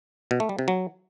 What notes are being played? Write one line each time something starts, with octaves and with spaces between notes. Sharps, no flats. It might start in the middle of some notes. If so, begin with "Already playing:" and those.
B2
A3
G3
C3
F#3